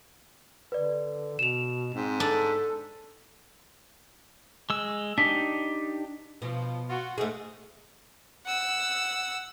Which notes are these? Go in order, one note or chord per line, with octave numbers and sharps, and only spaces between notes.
D3 B4 D5
B2 E7 F7
G#2 C4
D4 A4
G#3 E6
D4 D#4 G4 B6
B2 F3
F4 F#4
G#2 A3 G#4
F#5 E6